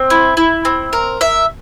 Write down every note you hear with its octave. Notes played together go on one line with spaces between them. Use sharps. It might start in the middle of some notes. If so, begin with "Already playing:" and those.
Already playing: C4
E4
E4
C4
A#4
E5